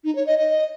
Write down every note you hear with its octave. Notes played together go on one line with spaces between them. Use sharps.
D#4
C#5
D#5
D#5